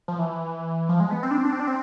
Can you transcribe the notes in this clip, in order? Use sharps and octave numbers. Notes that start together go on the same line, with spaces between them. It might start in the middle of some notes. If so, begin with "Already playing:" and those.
F3
E3
F3
G#3
B3
C4
D4
C4
D4
C4
D4
C4